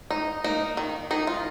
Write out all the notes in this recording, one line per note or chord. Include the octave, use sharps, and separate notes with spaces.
D#4
A#3 D#4
D#3
D#3 D#4
F4